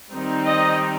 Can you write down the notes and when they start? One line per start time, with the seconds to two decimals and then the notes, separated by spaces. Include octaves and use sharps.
0.13 D#3 G3 C4 D#4
0.46 D#5